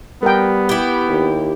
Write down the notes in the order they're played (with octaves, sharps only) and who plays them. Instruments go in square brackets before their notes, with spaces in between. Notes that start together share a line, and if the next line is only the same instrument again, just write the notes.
[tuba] G3 [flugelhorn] B3 [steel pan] A#4 G5
[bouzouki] E4 G4
[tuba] D#2